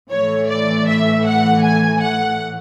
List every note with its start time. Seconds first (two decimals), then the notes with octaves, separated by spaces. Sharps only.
0.12 A2 E3 A3 C#5
0.50 D5
0.88 E5
1.26 F#5
1.63 G#5
2.01 F#5